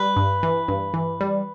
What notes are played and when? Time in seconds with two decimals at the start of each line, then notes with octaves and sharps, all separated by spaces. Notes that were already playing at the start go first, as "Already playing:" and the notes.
Already playing: G3 B4
0.17 G2
0.43 E3
0.68 G2
0.94 E3
1.21 G3